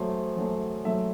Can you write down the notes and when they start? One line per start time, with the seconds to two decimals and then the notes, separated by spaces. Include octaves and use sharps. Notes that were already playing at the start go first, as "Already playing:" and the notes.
Already playing: F#2 F#3 A3 C5
0.37 F#2 F#3 A3
0.85 F#2 F#3 A3 E5